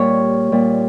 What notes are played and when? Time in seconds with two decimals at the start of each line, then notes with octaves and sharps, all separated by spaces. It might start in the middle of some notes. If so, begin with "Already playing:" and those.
Already playing: A#2 G3 C#5
0.52 A#2 G3